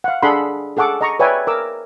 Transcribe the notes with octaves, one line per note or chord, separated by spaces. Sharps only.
F5 F#5
D4 G#4 A4 F#5 B5 C6
G#4 A4 F#5 C#6 D6
D#5 A#5 C#6
B4 C#5 D5 E5 G5 G#5
A#4 D6 E6